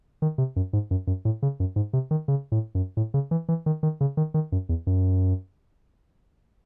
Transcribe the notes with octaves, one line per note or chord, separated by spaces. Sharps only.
D#3
C3
F#2
G#2
F#2
F#2
A2
C#3
F#2
G#2
C3
D#3
C#3
A2
F#2
A2
C#3
E3
E3
D#3
D#3
C#3
D#3
D#3
F#2
E2
F#2